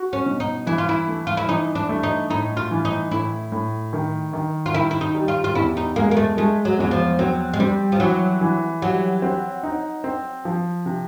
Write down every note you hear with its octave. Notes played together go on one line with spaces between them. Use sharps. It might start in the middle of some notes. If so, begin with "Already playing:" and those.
Already playing: F#4
C#4
B2
D#4
E3 E4
F4
E4
A3
F4
E4
E3 D#4
D4
A3
D#4
A2 D#4
F4
E3
D#4
A2 E4
A2
D#3
D#3
F4
D#3 E4
E4
D#4
G3
F4
F4
E2 E4
D#4
G#3 A#3
A#3
A3
G#3 A3
F#3
E2 F#3
F3
F#3 C4
G#3
G3 C4
F3
E3 F#3
E3
F#3 G3
C4
D#4
C4
F3
C3